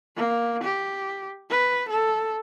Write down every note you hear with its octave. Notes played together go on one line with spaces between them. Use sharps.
A#3
G4
B4
A4